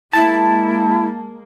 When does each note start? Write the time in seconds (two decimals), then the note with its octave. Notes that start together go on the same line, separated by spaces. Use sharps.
0.13 G#3 A#3 E4 A5